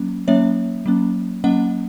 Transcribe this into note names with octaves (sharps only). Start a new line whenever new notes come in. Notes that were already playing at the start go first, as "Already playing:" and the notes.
Already playing: F#3 A#3 C#4
F#3 A#3 C#4 C#5 E5
F#3 A#3 C#4
F#3 A#3 C#4 D#5 F#5